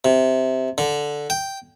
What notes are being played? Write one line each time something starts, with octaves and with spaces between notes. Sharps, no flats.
C3
D3
G5